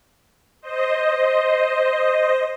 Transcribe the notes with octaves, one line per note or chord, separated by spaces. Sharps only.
C5 D#5